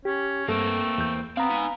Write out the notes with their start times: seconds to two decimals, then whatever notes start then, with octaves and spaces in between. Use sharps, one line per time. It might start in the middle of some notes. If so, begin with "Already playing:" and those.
0.05 C#4 G4
0.48 G2 A3 A#3 C4 A4
0.98 E2 G6
1.37 B3 C4 F5 A#5
1.50 D#4 G#5